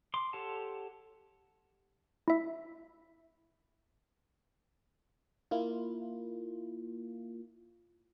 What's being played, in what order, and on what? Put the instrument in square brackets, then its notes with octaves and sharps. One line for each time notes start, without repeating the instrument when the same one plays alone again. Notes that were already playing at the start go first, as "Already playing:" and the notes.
[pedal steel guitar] C6 D6
G4 A4 C#5 F#5 A5
[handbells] E4 E5
[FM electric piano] A#3 E4 F4